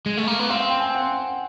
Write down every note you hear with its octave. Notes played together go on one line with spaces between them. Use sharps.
G#3
A3
A#3
B3
C4 F5
F5
G5
G#5
F#5